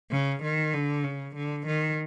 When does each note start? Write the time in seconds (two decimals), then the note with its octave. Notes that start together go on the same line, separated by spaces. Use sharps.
0.11 C#3
0.43 D#3
0.74 D3
1.04 C#3
1.35 D3
1.67 D#3